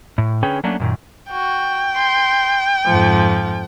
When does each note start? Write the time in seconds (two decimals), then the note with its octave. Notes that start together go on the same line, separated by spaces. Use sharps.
0.18 A2
0.43 D3 C#4 G#4 B4 C#5 G5
0.64 F#3 A3 A#3 C#4 D4
0.80 F#2 A#2 D#3
1.31 F#4 G5
1.96 C6
2.87 F2 G#2 F3